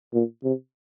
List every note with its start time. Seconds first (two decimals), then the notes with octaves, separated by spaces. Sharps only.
0.13 A#2
0.44 C3